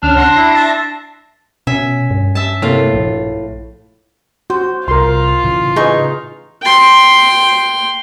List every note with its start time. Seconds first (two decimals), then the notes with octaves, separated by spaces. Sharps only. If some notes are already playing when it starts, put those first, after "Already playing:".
0.03 D2 C#4 D4 F6
0.17 F#5 C6 A#6
0.36 E4
0.55 E5 A5
1.67 B2 C#4 E5 G#5
2.11 G2
2.35 E5 A5
2.62 A2 C3 A3 A#3 F4
2.94 A#1
4.50 F#4 C5
4.88 C2 F4 A#4 C6
5.44 A2 C#3 E3
5.76 D#4 G#4 B4 C#6
6.62 G5 C6